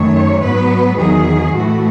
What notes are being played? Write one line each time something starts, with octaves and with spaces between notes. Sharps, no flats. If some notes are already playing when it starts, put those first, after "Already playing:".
Already playing: F#2 D#3 A3 C#5
G#2 F#3 B3 B4
E2 D#3 F#3 G#4
A2 E3 A3 F#4